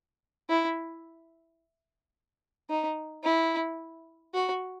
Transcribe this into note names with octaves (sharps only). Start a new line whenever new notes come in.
E4
D#4
E4
F#4